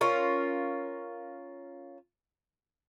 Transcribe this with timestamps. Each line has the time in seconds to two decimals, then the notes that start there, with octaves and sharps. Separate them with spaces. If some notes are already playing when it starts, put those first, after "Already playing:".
0.01 C#4 F4 A#4